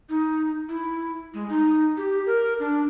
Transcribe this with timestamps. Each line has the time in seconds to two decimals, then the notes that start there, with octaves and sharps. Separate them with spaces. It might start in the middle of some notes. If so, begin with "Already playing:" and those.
0.09 D#4
0.69 E4
1.34 G#3
1.49 D#4
1.97 G4
2.26 A#4
2.60 D4